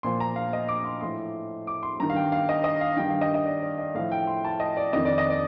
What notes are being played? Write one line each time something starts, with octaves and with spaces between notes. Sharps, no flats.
A#2 F3 C6
A#5
F5
D#5
D6
C6
A2 F3 C6
D6
C6
G2 D#3 A#5
F5
G5
F5
D#5
D#5
F5
G2 D#3 G5
F5
D#5
D#5
D5
D5
D#5
A2 F3 F5
G5
C6
A5
D#5
D5
F2 D#3 D#5
D5
D#5
D5